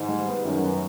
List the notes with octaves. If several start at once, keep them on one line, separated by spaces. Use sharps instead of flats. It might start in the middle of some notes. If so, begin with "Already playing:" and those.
Already playing: G#2 D#3
G3
B3
F#2 D#3
B3